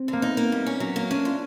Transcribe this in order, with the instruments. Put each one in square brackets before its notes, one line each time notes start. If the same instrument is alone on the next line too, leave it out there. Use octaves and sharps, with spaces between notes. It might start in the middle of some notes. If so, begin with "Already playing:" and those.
Already playing: [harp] C4
[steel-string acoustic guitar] D3 [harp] A#3
[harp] B3 [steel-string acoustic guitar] D#4
[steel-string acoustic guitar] A#3
G3
C#4
F#3
A#3
[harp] C#4 [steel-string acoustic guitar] D4
[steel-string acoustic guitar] F4